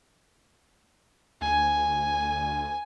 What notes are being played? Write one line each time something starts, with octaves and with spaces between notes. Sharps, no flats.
D2 G#5